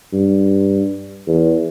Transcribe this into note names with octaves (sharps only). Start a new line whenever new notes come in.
G2
E2